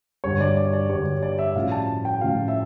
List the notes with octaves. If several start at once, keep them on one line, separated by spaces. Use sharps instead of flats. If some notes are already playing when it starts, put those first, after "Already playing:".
G2 D3 G3 C#5
D5
D5
D5
G2 D3 G3 C#5
C#5
D5
E5
A2 F3 C#4 F5
A5
G5
A2 F3 C#4 F5
E5